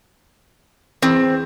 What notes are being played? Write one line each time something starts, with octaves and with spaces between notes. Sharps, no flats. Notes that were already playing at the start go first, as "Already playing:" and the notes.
E2 C4